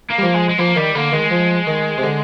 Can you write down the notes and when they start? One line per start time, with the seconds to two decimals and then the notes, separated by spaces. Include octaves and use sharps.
0.10 A#3
0.18 G3
0.23 F3
0.34 G#3
0.49 G#3
0.59 F3 A#3
0.76 D#3 G3
0.95 D3 A#3
1.12 D#3 G#3
1.31 F3
1.67 D#3
1.98 C3
2.03 D3